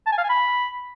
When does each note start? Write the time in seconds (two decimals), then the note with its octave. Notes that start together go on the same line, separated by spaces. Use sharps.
0.07 A5
0.12 G#5
0.18 F5
0.24 G#5
0.30 B5